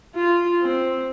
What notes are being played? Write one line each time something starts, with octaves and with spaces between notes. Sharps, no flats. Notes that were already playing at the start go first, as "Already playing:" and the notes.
F4
C4